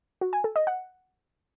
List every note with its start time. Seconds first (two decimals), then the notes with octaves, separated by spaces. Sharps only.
0.21 F#4
0.33 G#5
0.44 A4
0.56 D#5
0.67 F#5